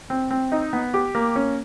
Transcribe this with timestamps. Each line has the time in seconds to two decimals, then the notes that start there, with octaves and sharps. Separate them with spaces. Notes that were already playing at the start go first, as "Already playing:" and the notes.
0.10 C4
0.31 C4
0.52 D#4
0.73 B3
0.94 G4
1.15 A#3
1.36 C#4